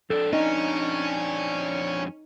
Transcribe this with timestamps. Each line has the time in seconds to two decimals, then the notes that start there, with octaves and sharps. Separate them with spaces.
0.10 F2 D4 A4
0.33 C#4 D#4 D#5